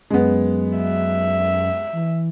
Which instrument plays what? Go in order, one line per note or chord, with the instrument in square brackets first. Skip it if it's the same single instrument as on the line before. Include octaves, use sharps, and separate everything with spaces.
[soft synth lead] F#2 [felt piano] G#3 B3
[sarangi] E5
[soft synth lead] E3